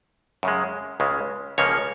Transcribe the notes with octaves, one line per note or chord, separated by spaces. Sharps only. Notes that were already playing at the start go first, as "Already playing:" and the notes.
F#2 C#3 G#3
C#2 C#3 G#3
C#2 C#3 F3 A#3 C#5